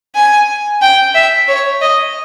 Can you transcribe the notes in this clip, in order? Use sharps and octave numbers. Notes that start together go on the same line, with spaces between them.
G#5
G5
E5
C#5
D#5